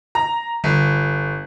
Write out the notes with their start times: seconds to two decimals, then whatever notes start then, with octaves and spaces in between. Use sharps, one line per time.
0.15 A#5
0.64 G1